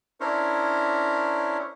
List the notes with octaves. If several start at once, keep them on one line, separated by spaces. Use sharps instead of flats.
C#4 D4 E4 A#4 C5 C#5